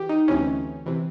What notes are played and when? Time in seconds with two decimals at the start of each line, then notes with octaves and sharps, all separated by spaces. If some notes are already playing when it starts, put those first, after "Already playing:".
Already playing: E3 G4
0.09 D#4
0.28 D2 C3 E3 C#4
0.86 C3 E3